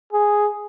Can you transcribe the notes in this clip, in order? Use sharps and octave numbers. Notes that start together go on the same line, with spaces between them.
G#4